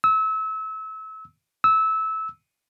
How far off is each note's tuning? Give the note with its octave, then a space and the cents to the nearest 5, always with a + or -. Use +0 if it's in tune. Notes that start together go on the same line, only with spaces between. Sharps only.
E6 -30
E6 -20